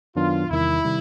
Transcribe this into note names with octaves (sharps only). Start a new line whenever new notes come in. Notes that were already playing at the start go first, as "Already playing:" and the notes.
F#2 D#3 F#3 B3 D4 F4
E2 C3 D#3 G3 E4
C3 D#3 G3